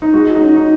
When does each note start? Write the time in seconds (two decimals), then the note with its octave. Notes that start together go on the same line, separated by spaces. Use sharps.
0.02 D#4
0.13 G#3 F#4
0.35 D#4
0.41 C#4
0.56 D#4